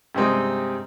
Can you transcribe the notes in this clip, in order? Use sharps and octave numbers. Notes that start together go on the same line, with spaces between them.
G2 C3 G#3 C4 D#4